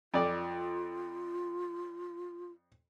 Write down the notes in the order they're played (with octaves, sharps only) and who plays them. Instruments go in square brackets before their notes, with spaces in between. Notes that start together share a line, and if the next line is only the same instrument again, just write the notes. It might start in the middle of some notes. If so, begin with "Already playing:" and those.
[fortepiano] F2 D5 [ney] F4